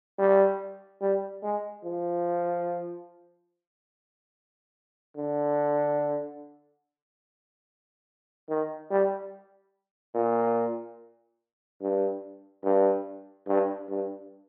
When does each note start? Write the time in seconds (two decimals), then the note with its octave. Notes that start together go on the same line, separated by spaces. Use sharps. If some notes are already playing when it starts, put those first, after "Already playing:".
0.18 G3
1.01 G3
1.43 G#3
1.84 F3
5.17 D3
8.49 D#3
8.90 G3
10.14 A#2
11.81 G2
12.64 G2
13.47 G2
13.89 G2